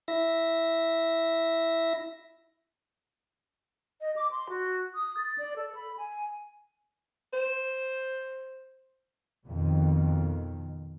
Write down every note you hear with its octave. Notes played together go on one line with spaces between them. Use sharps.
E4 E5 A#6
D#5
D6
C6
F#4
D#6
A6
D5
A4
B5
G#5
C5
F2 B2 D#3